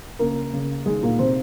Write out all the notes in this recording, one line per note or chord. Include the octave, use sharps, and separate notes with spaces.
C#2 A#3 A#4
C#3
D#3 G#3 G#4
A#2 A#3
C3 C4